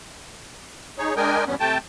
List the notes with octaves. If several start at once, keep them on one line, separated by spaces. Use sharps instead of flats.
D#4 G#4 C#5
G#3 D4 A#4 D#5 G5 G#5
E2 G2 B3 C#4
C3 A3 G5 A5